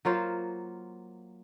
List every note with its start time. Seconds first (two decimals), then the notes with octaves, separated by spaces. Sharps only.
0.05 F#3 A#3 F4 C5